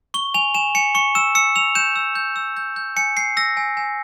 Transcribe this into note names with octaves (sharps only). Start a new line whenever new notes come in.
C#6 G7
G#5 F7
G#5 E7
G#5 C#7
C#6 C#7
E6 E7
E6 C#7
E6 F7
G6 E7
E6
G6
E6
G6
G6
G#5 C#7
G#5 C7
E6 A#6
G#5
G#5